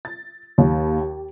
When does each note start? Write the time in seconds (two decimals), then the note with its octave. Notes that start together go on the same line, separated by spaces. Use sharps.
0.05 A6
0.58 D#2
1.01 G4